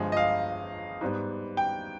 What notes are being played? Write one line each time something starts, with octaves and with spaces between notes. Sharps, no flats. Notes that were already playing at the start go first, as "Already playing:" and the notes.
Already playing: G1 G2 F3 G#3
D#5
F5
G#2 G3 B3
G5